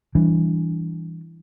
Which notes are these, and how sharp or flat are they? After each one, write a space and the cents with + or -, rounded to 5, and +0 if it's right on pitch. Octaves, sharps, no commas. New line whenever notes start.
E3 +0 G3 +0 D4 -15